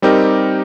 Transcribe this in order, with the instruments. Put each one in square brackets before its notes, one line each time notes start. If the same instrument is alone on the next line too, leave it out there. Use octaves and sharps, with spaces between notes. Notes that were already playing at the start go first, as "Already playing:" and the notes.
[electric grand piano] G3 C4 D#4 G4 A#4